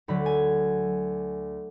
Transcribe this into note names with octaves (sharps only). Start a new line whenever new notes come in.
D2 D3 F#3 B5
G#5